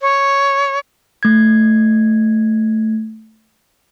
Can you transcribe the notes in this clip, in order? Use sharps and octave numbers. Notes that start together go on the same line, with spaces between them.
C#5
A3 G#6